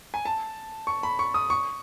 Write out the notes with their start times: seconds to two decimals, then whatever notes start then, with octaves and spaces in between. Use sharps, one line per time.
0.14 G#5
0.25 A5
0.87 C#6
1.03 B5
1.19 C#6
1.34 D#6
1.50 C#6